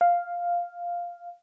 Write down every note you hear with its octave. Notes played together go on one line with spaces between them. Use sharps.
F5